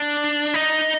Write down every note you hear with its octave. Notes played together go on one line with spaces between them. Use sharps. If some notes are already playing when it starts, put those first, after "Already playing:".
Already playing: D4
D#4